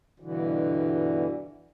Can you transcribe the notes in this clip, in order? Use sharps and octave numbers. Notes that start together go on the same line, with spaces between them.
G2 B2 D3 E3